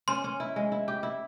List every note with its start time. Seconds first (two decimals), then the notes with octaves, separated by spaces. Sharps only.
0.08 C#4 C6
0.24 C#4
0.40 E4
0.56 G#3
0.72 E4
0.88 G4
1.03 E4